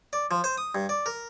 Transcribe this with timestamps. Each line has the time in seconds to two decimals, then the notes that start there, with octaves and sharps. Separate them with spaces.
0.13 D5
0.31 F3
0.44 C5
0.58 D#6
0.75 G2
0.89 D5
1.06 A#4